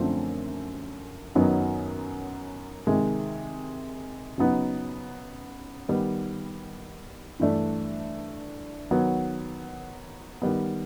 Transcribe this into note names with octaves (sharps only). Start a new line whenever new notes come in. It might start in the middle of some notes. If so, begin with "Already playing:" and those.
Already playing: F#2 D3 F3 A3 C4
F#2 D#3 F#3 B3 D#4
C3 D#3 G#3
C#3 F#3 B3 D#4
D#3 G3 B3
G2 E3 A3 D4
D#3 F#3 B3
D#3 G3 B3